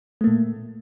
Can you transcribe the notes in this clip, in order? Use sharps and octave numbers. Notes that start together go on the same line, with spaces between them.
A#2 A3 A#3